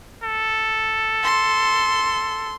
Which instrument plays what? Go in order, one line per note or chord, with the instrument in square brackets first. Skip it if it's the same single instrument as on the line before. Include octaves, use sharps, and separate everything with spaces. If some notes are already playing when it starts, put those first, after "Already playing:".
[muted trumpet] A4
[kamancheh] C6